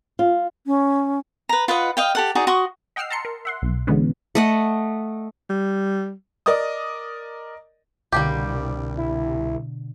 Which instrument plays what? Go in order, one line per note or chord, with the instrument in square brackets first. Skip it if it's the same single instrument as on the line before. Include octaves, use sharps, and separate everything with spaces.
[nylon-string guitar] F4
[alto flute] C#4
[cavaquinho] B4 A#5
F4 B4 D#5 F#5
D#5 F5 G5
G4 A4 F#5
D#4 F#4 G#4 D5
F#4 C6 C#6 D#6
[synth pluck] D#5 F#5 G5 E6 F6 C7
A5 A#5 C6 C#7
A#4
E5 F#5 C6
B1
B2 D3 E3 G#3 B3 C#4
[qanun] A3 D#5 F#5
[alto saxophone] G3
[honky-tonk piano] A#4 D5 D#5 D#6
[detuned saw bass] C2 [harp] B2 D3 [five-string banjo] G3 A#3 G4
[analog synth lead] E4